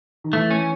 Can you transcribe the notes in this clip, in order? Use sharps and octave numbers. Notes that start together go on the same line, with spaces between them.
D#3
E3 A3
C#4